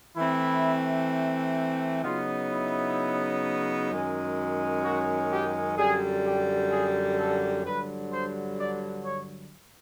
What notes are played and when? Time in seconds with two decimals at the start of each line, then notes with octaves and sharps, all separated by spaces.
0.16 E3 A3 C4 E4
2.04 C#3 F#3 B3 D#4 F4
2.51 E4
3.90 F#2 D#3 G#3 C#4
4.84 F#4
5.31 G4
5.78 F#2 D3 G3 G#4
6.25 G4
6.71 G#4
7.19 A4
7.65 G2 D3 F#3 B4
8.12 C5
8.59 D5
9.05 C#5